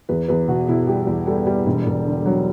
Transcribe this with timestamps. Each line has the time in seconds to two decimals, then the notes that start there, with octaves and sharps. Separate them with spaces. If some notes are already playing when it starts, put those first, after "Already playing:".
0.09 E2 B4
0.28 E2 B4
0.48 B2 F#4
0.68 B2 E4
0.87 G3 G4
1.07 E2
1.27 G3 A4
1.47 G3
1.66 E1
1.86 E1
2.05 D3
2.26 F#3